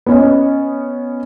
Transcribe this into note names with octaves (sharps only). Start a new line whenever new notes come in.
B3 C#4 D#5